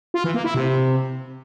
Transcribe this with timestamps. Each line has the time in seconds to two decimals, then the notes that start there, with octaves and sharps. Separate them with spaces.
0.14 F4
0.24 E3
0.34 A#3
0.44 E4
0.54 C3